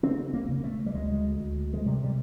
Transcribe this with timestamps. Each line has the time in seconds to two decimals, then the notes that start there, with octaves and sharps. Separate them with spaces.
0.03 C#3 C4
0.34 A#3
0.48 C#3
0.64 A3
0.86 G3
0.94 D2 G#3
1.40 D2
1.73 G#3
1.86 C3 G3
2.04 G3